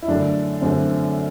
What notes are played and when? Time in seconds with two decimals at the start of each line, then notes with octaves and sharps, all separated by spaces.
0.02 E4
0.08 F#2 D3 A3 D4
0.61 F#2 D3 A3 C4